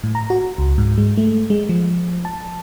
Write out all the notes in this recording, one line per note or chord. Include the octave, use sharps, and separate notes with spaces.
A2
A#5
F#4
C#2
G#2
G#3
A3
G#3
F3
A5